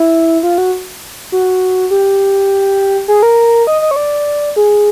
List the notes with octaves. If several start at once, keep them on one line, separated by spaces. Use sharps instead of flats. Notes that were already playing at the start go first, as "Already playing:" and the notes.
Already playing: E4
F4
F#4
F#4
G4
G#4
A#4
D#5
D#5
C#5
D5
G#4